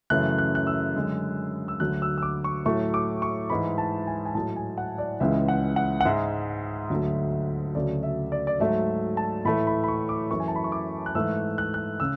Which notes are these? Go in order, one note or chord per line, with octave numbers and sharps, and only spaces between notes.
F#2 C#3 E3 A3 F#6
F#6
F#6
E6
F#2 D3 G#3
E6
D2 D3 F#3 A3 F#6
E6
E6
D6
C#6
A2 F#3 A3 C#6
D6
C#6
G#2 E3 G#3 B5
A5
G#5
G#5
A2 F#3 A3 A5
G#5
F#5
D5
C#2 C#3 E3 G#3 E5
F#5
F#5
F#5
G#2 G#3 E5
D2 D3 F#3 A3
D2 C#3 F#3 A3 D5
E5
D5
D5
G#2 F#3 A3 E5
A5
A2 E3 A3 B5
B5
B5
C#6
D6
F#2 E3 A3 C#6
G#5
A5
B5
C#6
D6
F#6
G#2 E3 A3 E6
F#6
F#6
C#3 E6